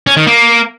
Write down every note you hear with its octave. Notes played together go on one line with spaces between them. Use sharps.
C#4
D#3
A#3